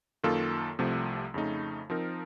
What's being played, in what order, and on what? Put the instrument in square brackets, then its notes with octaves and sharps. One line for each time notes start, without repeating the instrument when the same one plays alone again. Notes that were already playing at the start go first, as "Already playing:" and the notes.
[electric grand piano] F#2 D#3 A#3 F4 A4
C2 C3 F3 A3
F2 C#3 A3 D#4
F3 C4 D#4 A#4